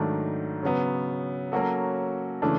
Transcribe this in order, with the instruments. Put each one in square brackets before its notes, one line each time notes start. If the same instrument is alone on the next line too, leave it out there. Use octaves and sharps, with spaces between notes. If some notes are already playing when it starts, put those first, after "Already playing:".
Already playing: [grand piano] G#2 D#3 F#3 A3 D4
C#3 F#3 B3
F#3 A#3 C#4 F#4 A4
C#3 E3 A3 D4